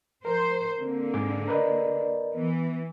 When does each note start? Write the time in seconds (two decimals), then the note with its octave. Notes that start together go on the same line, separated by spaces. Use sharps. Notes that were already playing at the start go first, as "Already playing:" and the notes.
0.25 F3 A#4 C5
0.79 D3 A#3 C4
1.14 G#2 G#4 D6
1.48 A#4 B4 D5 D#5
2.34 E3 B3